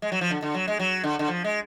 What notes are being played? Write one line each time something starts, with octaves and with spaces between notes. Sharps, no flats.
G#3
F#3
F3
D3
D3
F#3
G#3
F#3
D3
D3
F3
G#3